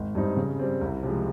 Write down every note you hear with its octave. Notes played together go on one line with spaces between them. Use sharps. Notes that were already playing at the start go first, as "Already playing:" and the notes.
Already playing: G#1
G2 G3 C4 D#4
C#3
G3 C4
C2
C3 F3 G#3